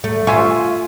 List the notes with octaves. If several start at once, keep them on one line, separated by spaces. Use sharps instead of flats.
A3
F4 E5 G#5 C#6